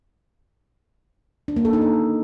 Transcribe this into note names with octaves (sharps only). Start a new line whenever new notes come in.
D4
A#3
A4
D#4
D4